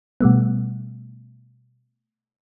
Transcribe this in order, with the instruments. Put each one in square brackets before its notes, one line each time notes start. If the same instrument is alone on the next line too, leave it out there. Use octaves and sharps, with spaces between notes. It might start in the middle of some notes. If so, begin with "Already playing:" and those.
[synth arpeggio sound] B2 G3 A3 B3